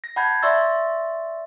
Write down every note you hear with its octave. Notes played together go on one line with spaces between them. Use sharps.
A#6
F#5 A5 B5 G6 G#6
D5 E5 C6 C#6 E6 A6